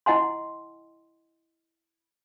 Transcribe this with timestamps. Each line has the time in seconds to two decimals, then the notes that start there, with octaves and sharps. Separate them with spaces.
0.06 E4 D#5 F#5 G#5 C6